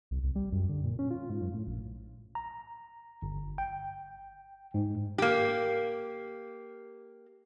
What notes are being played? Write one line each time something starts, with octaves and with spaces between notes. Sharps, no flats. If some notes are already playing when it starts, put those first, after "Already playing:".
C2
C2
G3
F#2
D3
A#2
C#4
F4
G#2
F#2
A2
A#1
A#5
G1
G5
G#2
A#3 G4